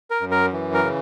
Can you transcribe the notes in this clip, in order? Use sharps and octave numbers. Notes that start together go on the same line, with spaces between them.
A#4
F#2
A#4
E3
A#4
C#3